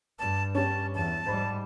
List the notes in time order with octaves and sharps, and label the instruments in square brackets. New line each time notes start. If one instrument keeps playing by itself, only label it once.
[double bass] G2 [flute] A5
[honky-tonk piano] C#4 G4 [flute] A5
[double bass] E2 [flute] A5
[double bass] G#2 G3 [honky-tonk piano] C5 B5